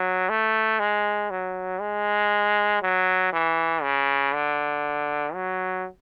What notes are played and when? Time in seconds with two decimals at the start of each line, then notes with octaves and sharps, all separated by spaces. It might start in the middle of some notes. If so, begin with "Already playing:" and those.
Already playing: F#3
0.29 A3
0.80 G#3
1.31 F#3
1.81 G#3
2.82 F#3
3.33 E3
3.83 C#3
4.34 D3
5.34 F#3